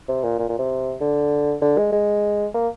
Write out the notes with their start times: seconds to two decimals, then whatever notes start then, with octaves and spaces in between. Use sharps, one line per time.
0.08 C3
0.23 A#2
0.39 A#2
0.49 A#2
0.59 C3
1.01 D3
1.62 D3
1.77 G#3
1.92 G#3
2.54 A#3